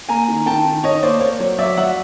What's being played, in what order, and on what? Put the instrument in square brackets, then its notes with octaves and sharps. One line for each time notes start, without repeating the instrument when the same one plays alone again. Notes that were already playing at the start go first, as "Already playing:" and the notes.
[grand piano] A#3 G#5 A#5
D#3
D#3 G5 A5
D#3
D#3 C#5 D#5
A#3 C5 D5
A#3 C#5
F#3 C#5
F#3 D5 E5
F#3 E5 F#5